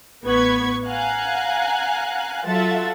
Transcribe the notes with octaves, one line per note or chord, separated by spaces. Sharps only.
A1 B3 B4 C#6 G#6 B6
F5 F#5 G#5 A#5 F#6
F#3 F4 A4 E5 F#5 A6